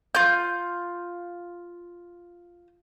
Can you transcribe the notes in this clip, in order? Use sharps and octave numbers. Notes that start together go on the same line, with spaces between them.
F4 G6